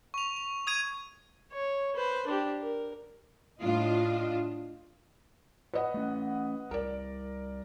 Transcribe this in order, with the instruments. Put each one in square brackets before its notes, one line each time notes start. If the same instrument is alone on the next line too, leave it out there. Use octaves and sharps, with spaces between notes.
[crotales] C#6 F7
F7
D#6 G#6 D#7
[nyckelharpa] C#5
B4 C5
D4 G4
A#4
[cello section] A2 D4 F4 D#5
[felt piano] B4 D#5 F#5
[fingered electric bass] A3 C#4
[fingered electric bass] C2 [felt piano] A#4 D5